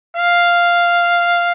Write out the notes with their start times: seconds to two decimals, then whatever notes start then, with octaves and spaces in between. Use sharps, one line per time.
0.17 F5